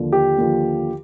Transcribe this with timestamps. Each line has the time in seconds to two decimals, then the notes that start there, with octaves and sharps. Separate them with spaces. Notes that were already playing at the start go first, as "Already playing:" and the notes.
Already playing: D#2 D3 F3
0.13 G4
0.38 D#2 D3 F3